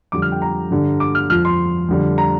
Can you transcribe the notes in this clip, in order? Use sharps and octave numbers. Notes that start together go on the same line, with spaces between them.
F2 D3 G3 D6
F6
G5
A#5
G2 D3 G3
D6
F6
F2 F3 F6
C6
F2 D3 G3
A#5